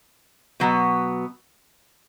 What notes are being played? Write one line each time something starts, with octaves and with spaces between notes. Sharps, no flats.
B2 F#3 B3